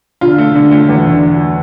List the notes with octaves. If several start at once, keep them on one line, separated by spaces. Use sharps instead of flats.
D3 F4
A3
D3
A3
E2
D3